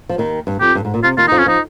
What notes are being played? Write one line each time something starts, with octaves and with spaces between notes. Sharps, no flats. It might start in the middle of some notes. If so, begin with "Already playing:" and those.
F3
D#2 D#3
G2
F2 G4
G2
G#2
A#2
C3 F4
D#2 D#3 F4
F2 F3 D#4
C#4
F3 D#4